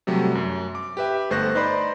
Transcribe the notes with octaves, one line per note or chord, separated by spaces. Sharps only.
C3 F#3 G3 A3
F#2
D6
G4 B4 E5 G5
G1 A3 C5 C#6 F#6 A#6
D#4 B4 C5 D5 B5 C6